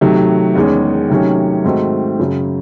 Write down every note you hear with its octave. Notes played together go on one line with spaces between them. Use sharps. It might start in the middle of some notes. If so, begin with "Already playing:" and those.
C3 D#3 F#3 A3
E2 D#3 G#3 C#4
C3 D#3 F#3 A3 C#4
G#2 D#3 A3 C4 F#4
F#2 C#3 F#3